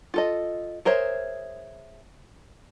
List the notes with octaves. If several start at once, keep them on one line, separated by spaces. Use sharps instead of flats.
F4 A4 D#5
G#4 A#4 C5 C#5 E5